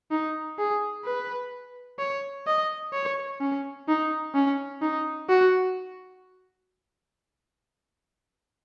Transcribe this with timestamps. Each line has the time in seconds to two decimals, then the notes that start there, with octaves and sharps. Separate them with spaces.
0.11 D#4
0.59 G#4
1.05 B4
1.99 C#5
2.46 D#5
2.93 C#5
3.41 C#4
3.88 D#4
4.34 C#4
4.82 D#4
5.29 F#4